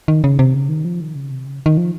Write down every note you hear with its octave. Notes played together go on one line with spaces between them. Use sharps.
D#3
C#3
C3
C#3
D#3
F3
D#3
C#3
C3
C#3
D#3
F3